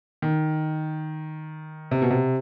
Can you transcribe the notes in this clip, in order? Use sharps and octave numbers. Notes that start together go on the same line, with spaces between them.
D#3
C3
B2
C3